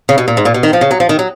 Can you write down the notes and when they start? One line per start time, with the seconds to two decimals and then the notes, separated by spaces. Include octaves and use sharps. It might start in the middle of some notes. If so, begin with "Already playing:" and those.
0.09 C#3
0.18 B2
0.28 A#2
0.37 G#2
0.45 A#2
0.54 B2
0.63 D#3
0.73 F3
0.81 C#3
0.91 F#3
1.00 F3
1.09 D#3
1.19 F#3